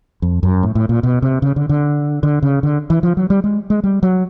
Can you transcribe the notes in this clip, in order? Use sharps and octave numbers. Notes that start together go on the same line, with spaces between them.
F2
F#2
A2
A2
A#2
B2
C3
C#3
D3
D3
D3
C#3
D3
E3
F3
F#3
G3
G#3
G#3
G3
F#3